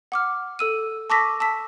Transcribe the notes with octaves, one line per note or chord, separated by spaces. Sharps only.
F#5 D6 F6
A4 E6 D#7
A5 C#6 D6 E6 A#6 B6
A5 E6 B6